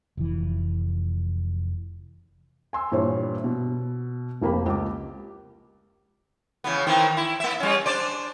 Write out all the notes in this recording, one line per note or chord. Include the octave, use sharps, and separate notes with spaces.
F1 E3
G#5 C6 E6
G2 A#2 E3 C5 C#5
B2
F1 F2 A#3 G4 B5
C#2 G4 D6
C#3 E3 B3
D#3 E3 C4
E4
A#3 E5
G3 C#4
D4 C5 D5